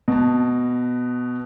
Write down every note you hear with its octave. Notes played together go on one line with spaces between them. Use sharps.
B2 A5